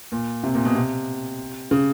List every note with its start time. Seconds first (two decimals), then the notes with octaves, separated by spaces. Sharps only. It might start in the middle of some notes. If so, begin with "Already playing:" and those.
0.12 A#2
0.43 C3
0.55 A#2
0.65 B2
0.75 C3
1.71 C#3